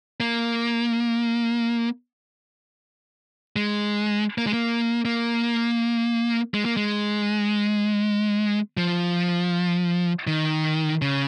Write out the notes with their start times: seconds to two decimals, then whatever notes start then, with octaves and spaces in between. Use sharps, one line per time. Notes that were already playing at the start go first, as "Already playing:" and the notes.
0.20 A#3
3.56 G#3
4.38 A#3
4.46 G#3
4.53 A#3
5.05 A#3
6.54 G#3
6.65 A#3
6.77 G#3
8.77 F3
10.27 D#3
11.02 C#3